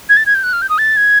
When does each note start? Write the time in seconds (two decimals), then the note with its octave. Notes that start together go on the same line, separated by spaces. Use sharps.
0.09 G#6
0.17 A6
0.26 G#6
0.35 G6
0.43 F#6
0.53 F6
0.62 G6
0.69 D#6
0.78 A6
0.97 G#6